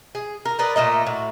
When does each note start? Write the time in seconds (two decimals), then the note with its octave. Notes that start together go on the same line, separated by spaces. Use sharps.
0.15 G#4
0.45 A#4
0.59 A#4 B4 D5 D#5
0.76 A#2 A3 A#3 D#5
1.07 A2 F#4